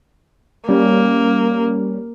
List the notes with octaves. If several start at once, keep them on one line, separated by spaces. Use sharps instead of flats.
G3 A#3 C#4